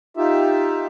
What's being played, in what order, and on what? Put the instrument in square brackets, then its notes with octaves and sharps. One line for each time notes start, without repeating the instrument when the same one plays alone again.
[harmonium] D#4 F4 G4 E5